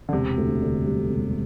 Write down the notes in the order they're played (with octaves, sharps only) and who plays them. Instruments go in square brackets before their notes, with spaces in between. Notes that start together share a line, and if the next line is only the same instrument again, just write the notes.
[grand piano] D3
[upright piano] E1 [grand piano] C3
[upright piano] D2
D3
G3
E1